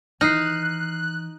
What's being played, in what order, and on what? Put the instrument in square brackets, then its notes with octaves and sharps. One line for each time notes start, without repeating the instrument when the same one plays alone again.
[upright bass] D#3 E3 [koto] D#4 [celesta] F6 C7 [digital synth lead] F#6